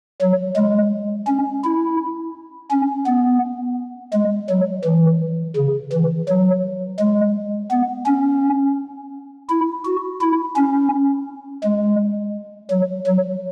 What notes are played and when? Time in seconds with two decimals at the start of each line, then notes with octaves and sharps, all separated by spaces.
0.21 F#3
0.57 G#3
1.28 C#4
1.64 E4
2.71 C#4
3.07 B3
4.14 G#3
4.49 F#3
4.85 E3
5.56 C#3
5.93 E3
6.28 F#3
7.00 G#3
7.71 B3
8.07 C#4
9.49 E4
9.85 F#4
10.21 E4
10.56 C#4
11.64 G#3
12.70 F#3
13.06 F#3